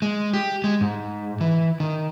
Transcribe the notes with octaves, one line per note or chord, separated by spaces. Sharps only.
G#3
G4
G#3
G#2
E3
D#3